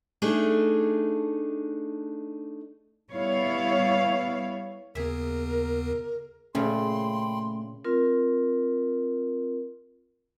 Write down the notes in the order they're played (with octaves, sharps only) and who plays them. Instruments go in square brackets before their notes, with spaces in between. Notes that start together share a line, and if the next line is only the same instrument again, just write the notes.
[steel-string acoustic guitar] A3 D4 D#4 G#4
[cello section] G3 B3 E4 C#5 F5
[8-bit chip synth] D#2 C#3 B3 [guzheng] G#4 E5 [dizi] A#4
[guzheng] A#2 C#3 F3 [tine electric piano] A3 C#4 [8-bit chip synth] G5 B5 [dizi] C6
[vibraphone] C4 F4 A#4